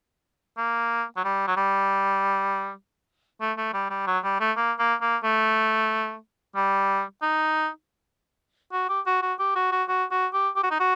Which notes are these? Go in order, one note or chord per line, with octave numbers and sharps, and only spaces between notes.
A#3
F#3
G3
F#3
G3
A3
A3
G3
G3
F#3
G3
A3
A#3
A#3
A#3
A3
G3
D#4
F#4
G4
F#4
F#4
G4
F#4
F#4
F#4
F#4
G4
G4
F#4
D#4
F#4